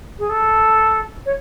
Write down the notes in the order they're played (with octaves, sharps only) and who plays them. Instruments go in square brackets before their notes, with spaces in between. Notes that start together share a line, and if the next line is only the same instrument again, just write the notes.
[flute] G#4
A4
C#5